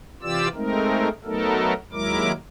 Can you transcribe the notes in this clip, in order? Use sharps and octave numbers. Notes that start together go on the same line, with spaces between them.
C3 E3 F4 G4 D5 E6
G#3 A3 C4 D#4 A#4
F#3 A3 B3 D#4 A4 A#4
D#2 F#3 G#3 E4 A#4 D6